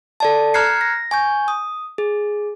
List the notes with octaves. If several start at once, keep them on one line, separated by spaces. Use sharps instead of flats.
A4 D5 A5
A#5 F6 F#6 G#6 C7 C#7
A#6
G#5 C#6 G6
D#6
G#4